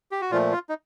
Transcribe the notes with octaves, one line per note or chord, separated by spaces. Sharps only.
G4
F#4
A#2 F3 A3 F4
F4
D#4